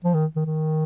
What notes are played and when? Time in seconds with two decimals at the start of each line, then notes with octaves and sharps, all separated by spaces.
0.04 F3
0.14 D#3
0.36 D#3
0.46 D#3